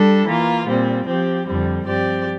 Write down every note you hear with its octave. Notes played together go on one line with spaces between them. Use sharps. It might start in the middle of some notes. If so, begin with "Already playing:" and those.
Already playing: G3 D4 A4
E3 A#3 F4
A#2 G3 C4
F3 C4 G4
F2 D3 G3 C4
G2 F3 C4 G4 D5